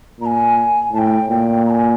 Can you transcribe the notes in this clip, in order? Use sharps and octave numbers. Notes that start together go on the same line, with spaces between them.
A#2 A#5
G#5
A2 G5 A5
A#2 G5
A#5
G#5